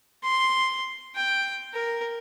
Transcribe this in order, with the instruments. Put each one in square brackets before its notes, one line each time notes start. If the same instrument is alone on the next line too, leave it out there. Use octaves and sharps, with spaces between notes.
[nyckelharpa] C6
G5
A#4